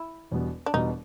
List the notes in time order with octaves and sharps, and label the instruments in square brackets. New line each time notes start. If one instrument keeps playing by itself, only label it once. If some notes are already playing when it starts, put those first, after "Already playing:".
Already playing: [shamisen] E4
[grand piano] E1 E2 B2 G3 B3
[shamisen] D4
[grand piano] E1 E2 B2 G3 B3 [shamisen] D#4